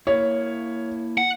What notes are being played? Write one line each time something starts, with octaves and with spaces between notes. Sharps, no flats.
A#3 E4 C#5
F#5